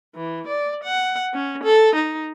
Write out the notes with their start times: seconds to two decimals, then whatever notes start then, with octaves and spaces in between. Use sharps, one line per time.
0.16 E3
0.47 D5
0.83 F#5
1.34 C#4
1.63 A4
1.95 D#4